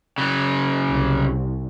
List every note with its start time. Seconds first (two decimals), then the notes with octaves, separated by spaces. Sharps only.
0.18 C#3 F#3
0.90 C2